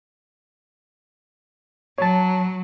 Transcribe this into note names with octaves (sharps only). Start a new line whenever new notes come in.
F#3 C#5 A5